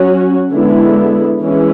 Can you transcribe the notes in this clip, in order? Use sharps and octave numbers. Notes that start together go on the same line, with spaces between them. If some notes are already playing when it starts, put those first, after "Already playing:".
Already playing: F#3 C#4 F#4
D3 G#3 B3 E4
E3 G#3 C#4 E4